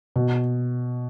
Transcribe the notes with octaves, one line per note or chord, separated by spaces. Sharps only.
B2